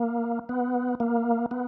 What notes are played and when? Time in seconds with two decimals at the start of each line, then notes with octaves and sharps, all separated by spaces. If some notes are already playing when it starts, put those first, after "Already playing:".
Already playing: A#3
0.49 B3
1.00 A#3
1.51 B3